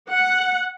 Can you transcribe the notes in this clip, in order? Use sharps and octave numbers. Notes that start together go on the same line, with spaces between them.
F#5